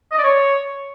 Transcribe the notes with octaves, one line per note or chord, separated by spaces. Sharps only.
D#5
D5
C#5